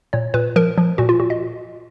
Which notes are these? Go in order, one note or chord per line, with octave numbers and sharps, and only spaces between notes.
A#2 C#5
A#2 B4
F3 A#4
F3
A#2 F#4
F4
A#2 F#4
D#5